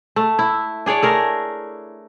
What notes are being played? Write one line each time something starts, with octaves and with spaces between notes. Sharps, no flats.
A3
E4
D4 G#4 C#5 D5
A3 G#4 A#4